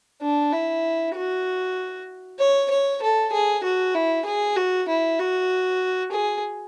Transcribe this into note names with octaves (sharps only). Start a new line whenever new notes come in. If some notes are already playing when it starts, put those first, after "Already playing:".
D4
E4
F#4
C#5
C#5
A4
G#4
F#4
E4
G#4
F#4
E4
F#4
G#4